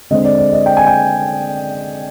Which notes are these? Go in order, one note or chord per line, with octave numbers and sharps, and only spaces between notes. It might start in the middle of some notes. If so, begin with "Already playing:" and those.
D3 G#3 C4 D#5
D5
D5
D#5
G5
G#5
G5